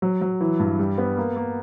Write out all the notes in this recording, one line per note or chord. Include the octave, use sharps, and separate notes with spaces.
F#3
F#3
E3
G2
G3
B3
A#3
A#3